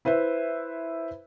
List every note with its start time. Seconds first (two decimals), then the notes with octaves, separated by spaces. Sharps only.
0.05 E4 B4 C5 E5